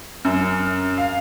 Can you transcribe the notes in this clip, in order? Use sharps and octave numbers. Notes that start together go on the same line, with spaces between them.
F#2
F5